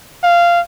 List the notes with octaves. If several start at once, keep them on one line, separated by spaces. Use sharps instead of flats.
F5